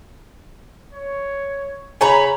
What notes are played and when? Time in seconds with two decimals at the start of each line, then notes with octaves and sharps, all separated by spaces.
0.93 C#5
2.01 C#3 C#5 G#5 A#5 B5